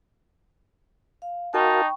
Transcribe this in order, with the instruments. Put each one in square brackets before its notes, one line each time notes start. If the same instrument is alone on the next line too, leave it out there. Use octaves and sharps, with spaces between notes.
[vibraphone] F5
[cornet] D#4 [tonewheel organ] F#4 A#4 F5 [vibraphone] G5 B5 C#6 [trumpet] A5